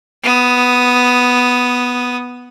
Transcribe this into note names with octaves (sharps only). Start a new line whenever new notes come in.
B3 D#6